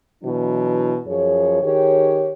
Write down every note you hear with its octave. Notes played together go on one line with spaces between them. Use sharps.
B2 E3 F#3 D4 E4
F#2 F3 G#4 C#5
D#3 G4 G#4 C#5